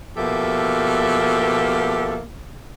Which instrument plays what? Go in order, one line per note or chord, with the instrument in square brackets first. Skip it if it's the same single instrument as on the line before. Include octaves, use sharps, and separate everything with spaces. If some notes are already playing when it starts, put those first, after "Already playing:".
[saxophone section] B2 F3 A#3 G4 A4 E5